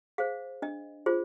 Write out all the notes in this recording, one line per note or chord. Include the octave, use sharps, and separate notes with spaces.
G#4 C5 F5
D4 D#5
F4 G#4 C5